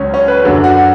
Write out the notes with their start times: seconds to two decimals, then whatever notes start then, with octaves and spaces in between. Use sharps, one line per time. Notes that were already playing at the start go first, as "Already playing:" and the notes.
Already playing: C#2 C#3 F#3 C#4
0.14 C#4
0.28 B4
0.44 F#2 D3 F#3
0.64 F#4